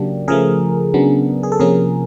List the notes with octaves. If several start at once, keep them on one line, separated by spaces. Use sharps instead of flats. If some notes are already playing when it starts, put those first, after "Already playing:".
Already playing: C#3 F#3 A#3 D4 G4
C#3 F3 A3 G#4 A#4
C#3 F#3 B3 D4
G#4
A4
C3 F3 A#3 C#4 G#4 A#4